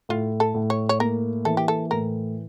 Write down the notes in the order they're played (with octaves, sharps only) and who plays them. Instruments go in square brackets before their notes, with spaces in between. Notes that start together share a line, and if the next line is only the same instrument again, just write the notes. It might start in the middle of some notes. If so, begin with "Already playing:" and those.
[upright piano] A2 [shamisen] F4
[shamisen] A4
[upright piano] A2
[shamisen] C#5
C#5
[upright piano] A#3 [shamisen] A#4
[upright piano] E3 [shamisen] A4
[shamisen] G4
A4
[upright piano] A2 [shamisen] A#4